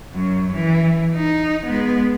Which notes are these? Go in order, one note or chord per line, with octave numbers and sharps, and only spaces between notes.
F#2 F#3
E3
D#4
G#3 B3